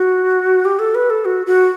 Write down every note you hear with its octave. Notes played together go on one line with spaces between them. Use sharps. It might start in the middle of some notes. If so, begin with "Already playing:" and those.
Already playing: F#4
G4
A4
B4
A4
F#4
F#4